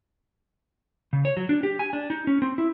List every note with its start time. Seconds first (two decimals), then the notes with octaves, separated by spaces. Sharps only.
1.13 C#3
1.25 C#5
1.37 F#3
1.49 D4
1.63 G4
1.79 G#5
1.93 D4
2.10 D#4
2.27 C#4
2.42 C4
2.58 E4